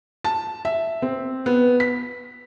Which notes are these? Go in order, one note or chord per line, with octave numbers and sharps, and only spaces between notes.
A5
E5
C4
B3
B6